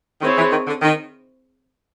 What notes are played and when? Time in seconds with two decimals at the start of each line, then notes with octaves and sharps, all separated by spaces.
0.21 D#3 C4 E4 G#4 C#5
0.37 E3
0.52 D#3
0.67 D3
0.82 D#3